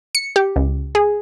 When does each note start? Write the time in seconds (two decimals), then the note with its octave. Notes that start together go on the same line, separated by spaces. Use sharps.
0.15 C#7
0.36 G4
0.56 C#2
0.95 G#4